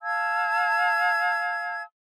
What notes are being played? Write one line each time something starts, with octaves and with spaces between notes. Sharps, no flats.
F5 A5 E6 G#6